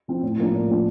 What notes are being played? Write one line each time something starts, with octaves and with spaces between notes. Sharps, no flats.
F3 C4 E4
A2
F3 A#3 D4
A2
F3 A#3 D4